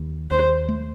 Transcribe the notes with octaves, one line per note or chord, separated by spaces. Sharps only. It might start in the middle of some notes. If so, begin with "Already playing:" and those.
Already playing: D#2
D#2 C5
A3